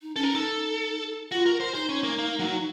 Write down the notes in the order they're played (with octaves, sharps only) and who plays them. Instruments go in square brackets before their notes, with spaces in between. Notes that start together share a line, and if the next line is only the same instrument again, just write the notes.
[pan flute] D#4
[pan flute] C#4 [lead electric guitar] A4
[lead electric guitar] A#4
[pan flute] D#4 [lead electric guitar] A4
[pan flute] F4 [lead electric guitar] F#4
[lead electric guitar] A#4
C5
[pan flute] D#4 [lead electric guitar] C5
[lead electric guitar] C#4
A#3
A#3
F#3